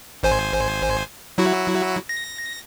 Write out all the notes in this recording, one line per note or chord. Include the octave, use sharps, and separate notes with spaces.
G#1 C5 G#5
F#3 E4 F#4
A#6